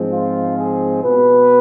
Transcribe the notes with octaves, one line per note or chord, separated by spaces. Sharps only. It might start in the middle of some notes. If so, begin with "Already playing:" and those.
Already playing: G#2 F3 G#3 C4
F4
G#4
B2 B3 B4